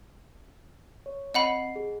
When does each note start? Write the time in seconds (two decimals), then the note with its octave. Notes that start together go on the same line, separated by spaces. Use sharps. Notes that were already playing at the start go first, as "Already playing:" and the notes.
1.06 C#5
1.34 C4 D#5 F#5 B5 C7
1.76 G#4